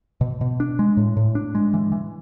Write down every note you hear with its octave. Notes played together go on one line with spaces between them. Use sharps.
B2
B2
D4
G#3
A2
A2
D4
G#3
E3
E3